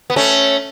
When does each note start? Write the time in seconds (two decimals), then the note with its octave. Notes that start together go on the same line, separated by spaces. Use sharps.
0.10 B3
0.16 A3 C#4